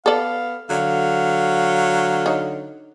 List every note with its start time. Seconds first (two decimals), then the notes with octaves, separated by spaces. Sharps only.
0.06 B3 A4 D5 F5
0.70 D3 F#3 F5
2.26 D#4 C#5